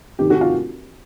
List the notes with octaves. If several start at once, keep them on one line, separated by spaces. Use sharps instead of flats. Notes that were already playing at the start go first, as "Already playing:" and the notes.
F1 D#2 D#3 G4
F#4
F4